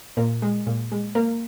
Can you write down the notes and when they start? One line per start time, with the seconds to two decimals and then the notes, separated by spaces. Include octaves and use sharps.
0.17 A#2 A#4
0.42 G#3
0.66 A#2
0.92 G#3
1.15 A#3 A#4